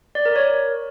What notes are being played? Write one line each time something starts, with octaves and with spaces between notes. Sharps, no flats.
D5
A#4
C#5